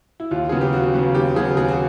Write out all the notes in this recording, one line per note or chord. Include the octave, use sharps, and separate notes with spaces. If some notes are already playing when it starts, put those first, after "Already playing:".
E4
D#2 F4
C#3 F#3 B3 G#4
G4
D#2 F#4
C#3 F#3 B3
D#2 G4
C#3 F#3 B3 G#4
D#2 G#4
F#4